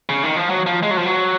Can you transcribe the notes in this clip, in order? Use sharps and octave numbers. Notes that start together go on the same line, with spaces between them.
C#3
D#3
F3
F#3
F3
G#3
F#3
F3
F#3